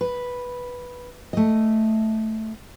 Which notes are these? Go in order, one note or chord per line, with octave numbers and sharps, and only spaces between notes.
B4
A3 D#5